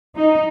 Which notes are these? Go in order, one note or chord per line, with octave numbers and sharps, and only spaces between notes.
D#4